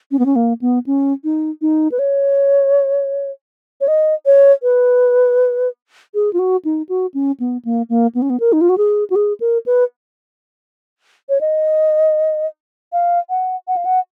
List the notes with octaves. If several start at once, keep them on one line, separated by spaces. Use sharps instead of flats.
C#4
B3
C#4
A#3
B3
C#4
D#4
D#4
B4
C#5
C#5
D#5
C#5
B4
G#4
F4
F#4
D#4
F#4
C#4
B3
A#3
A#3
B3
C#4
B3
A#4
D#4
F4
F#4
G#4
F#4
G#4
A#4
B4
C#5
D#5
F5
F#5
F#5
F5
F#5